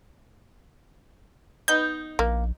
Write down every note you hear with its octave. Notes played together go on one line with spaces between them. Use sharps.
B3 D#4 G6
A#1 A#3